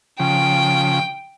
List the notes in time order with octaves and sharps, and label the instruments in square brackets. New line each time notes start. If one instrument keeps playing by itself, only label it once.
[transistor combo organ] C#3 F3 [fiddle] G5